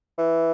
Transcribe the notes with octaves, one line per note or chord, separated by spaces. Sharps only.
E3